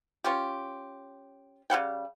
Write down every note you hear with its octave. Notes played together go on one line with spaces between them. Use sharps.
C#4 F4 G4
C#3 G3 F#5 G5